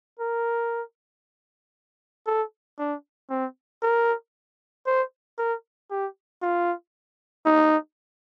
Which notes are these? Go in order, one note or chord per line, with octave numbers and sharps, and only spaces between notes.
A#4
A4
D4
C4
A#4
C5
A#4
G4
F4
D#4